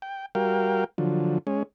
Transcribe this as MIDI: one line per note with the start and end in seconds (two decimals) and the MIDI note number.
0.02 0.26 79
0.35 0.84 55
0.35 0.84 66
0.35 0.84 70
0.35 0.84 77
0.35 0.84 79
0.98 1.38 50
0.98 1.38 53
0.98 1.38 54
1.47 1.63 56
1.47 1.63 61